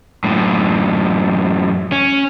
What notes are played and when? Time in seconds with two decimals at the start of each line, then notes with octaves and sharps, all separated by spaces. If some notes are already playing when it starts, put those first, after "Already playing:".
0.24 F#2 A2
1.92 C#4